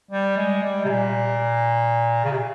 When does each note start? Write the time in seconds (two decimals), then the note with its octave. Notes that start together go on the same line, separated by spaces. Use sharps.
0.11 G3
0.37 G#3
0.63 G3
0.85 C3
0.89 A#2
2.24 C#3
2.31 C3
2.38 A#2